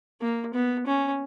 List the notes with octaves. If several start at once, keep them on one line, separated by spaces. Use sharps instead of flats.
A#3
B3
C#4